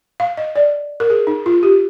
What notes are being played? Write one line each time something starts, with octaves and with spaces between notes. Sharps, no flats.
F5
D#5
D5
A#4
G#4
D#4
F4
G4